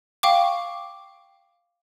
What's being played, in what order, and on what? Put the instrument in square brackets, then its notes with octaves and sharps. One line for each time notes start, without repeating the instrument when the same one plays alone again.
[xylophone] F5 G5 C#6 D6